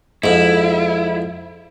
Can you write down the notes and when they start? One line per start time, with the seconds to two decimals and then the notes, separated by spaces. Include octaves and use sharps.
0.24 F2 G#2 E4